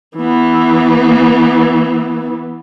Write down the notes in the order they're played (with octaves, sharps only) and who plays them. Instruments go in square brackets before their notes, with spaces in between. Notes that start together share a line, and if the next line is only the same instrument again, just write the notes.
[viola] E3 B3